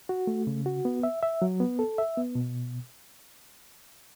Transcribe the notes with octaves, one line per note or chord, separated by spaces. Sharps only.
F#4
A3
C#3
F#4
B3
E5
E5
F#3
B3
A4
E5
B3
B2